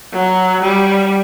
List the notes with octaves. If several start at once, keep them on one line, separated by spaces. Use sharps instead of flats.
F#3
G3